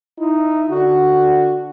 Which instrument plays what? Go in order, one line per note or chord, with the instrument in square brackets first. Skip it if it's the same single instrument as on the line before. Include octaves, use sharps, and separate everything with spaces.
[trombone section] D#4 E4
D3 F#4